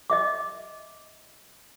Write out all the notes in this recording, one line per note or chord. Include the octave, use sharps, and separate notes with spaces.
D#5 E5 D6